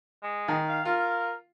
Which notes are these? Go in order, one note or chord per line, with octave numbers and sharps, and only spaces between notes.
G#3
D#3
F5
F4 A#4